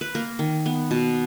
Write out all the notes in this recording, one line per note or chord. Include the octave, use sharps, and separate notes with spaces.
B4
A#3 A#4
D#3
B3
B2